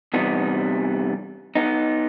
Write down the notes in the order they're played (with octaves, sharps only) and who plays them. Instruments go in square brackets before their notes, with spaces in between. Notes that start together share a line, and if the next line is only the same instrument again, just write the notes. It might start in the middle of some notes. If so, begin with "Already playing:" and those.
[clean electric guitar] E2 C3 E3 G3 B3 D#4
B3 D#4